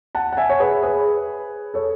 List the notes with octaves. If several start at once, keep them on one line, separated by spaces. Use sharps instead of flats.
F#5 A5
F#5
E5 G#5
C#5
G#4 B4
G#4 B4
A4 C#5